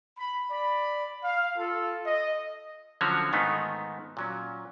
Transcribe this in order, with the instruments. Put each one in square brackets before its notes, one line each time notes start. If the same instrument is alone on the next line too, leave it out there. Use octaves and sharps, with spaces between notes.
[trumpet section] B5
D5 B5
F5
F4 A4
D#5
[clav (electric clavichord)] D3 F3 F#3 C#4 F#4 C#5
G#2 D#3 A3 B3 D#4
A#2 F#3 C#4